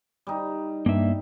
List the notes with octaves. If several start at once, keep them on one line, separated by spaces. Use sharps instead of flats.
G3 D#4
G2 A#3 E5